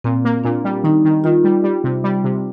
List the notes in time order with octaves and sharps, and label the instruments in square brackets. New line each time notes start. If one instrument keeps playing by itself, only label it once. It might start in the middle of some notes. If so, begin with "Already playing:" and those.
[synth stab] A#2 [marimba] C4
[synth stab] A#3
[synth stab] A#2 [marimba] D4
[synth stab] G3
[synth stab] D#3 [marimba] D#4
[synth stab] D#3
[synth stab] D#3 [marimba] F4
[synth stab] G3
G3
C3
G3
C3